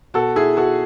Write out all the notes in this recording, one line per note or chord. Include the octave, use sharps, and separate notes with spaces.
B2 F#4 A4
E4 G#4
F#4 A4